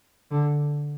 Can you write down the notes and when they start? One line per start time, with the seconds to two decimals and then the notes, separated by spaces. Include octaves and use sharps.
0.31 D3